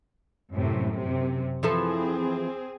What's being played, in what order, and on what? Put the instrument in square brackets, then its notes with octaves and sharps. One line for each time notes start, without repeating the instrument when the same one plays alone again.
[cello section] F#2 A2 C3
F#2 C3
[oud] E3 F3 A4 [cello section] C4 G#4